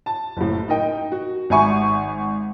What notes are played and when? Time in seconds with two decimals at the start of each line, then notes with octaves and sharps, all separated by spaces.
0.06 A5
0.37 F#1 A2
0.68 D#4 A#4 D#5 G5
1.12 F#4
1.50 G#1 E5 G#5 C#6